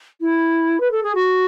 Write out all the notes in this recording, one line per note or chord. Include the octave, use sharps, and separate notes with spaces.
E4
B4
A4
G#4
F#4